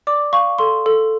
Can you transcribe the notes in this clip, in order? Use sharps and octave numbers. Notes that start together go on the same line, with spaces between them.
D5 D6
F5 C#6
A4 C6
A4